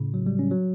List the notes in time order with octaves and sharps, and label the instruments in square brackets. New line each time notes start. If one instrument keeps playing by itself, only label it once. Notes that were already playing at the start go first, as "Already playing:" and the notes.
Already playing: [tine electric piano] A2 C#3
F#3
G3
C#4
F#3